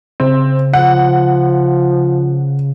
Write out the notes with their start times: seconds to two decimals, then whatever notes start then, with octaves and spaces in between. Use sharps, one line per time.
0.20 C#3 C4
0.74 F3 F#5